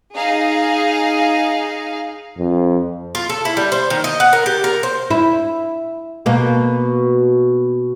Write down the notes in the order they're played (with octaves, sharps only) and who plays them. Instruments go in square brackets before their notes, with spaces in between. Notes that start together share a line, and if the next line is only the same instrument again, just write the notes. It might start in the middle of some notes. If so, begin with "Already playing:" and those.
[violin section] D#4 G#4 F5
[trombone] F2
[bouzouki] F4
A4
E4
G3
C5
D#3
D#5
F#5
A#4
G4
A#4
C5
[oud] E4
B2 A#3